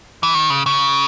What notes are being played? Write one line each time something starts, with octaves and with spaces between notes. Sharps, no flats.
E3
D#3
C#3
C#3